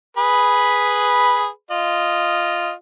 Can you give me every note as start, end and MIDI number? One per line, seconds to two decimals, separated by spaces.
0.17 1.48 68
0.17 1.48 71
0.17 1.48 83
1.71 2.71 65
1.71 2.71 75